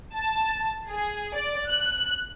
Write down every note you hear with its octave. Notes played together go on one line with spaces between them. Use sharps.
A5
G#4
D5
F#6